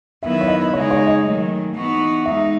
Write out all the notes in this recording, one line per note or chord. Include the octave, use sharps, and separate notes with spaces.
D#3 F#3 B3 E4 B4 E5
C#5
D#5
C#3 G#3 D#4 G#4 C#5
C#5
D#5
D#3 F#3 A3
E3 B3 D#4 F#4 B4
G#3 D#4 E5